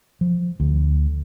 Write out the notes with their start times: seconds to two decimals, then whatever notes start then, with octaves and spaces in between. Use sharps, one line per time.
0.21 F3
0.60 D2